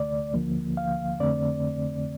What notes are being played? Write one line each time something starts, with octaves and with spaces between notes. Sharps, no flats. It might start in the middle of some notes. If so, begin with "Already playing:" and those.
Already playing: D2 D3 A3 D5
D2 D3 F3 A#3
F5
F2 D3 A3 C4 D5